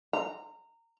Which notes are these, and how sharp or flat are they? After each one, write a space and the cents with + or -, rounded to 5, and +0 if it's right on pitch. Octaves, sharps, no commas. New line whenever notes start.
A#5 -20